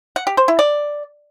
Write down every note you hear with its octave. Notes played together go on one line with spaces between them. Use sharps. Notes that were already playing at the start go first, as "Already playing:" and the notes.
F#5
G4
C5
E4
D5